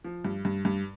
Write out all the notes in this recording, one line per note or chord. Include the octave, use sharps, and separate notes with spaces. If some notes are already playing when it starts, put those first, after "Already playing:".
F3
G2
G2
G2